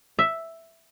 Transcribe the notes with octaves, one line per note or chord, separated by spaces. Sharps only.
E5